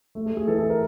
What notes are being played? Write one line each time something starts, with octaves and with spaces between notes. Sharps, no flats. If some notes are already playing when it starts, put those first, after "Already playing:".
A3
A4
A3
G#4
E3 A4
A4
A#4